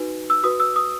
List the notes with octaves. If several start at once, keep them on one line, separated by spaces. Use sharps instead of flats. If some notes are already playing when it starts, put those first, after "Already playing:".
Already playing: D#4 F#4 B4
E6
F#4 B4 D#6
E6
D#6